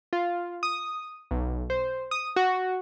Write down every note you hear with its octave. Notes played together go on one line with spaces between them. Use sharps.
F4
D#6
B1
C5
D#6
F#4